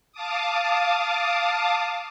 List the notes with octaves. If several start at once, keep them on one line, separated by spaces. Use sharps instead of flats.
F5 A5 D6 D#6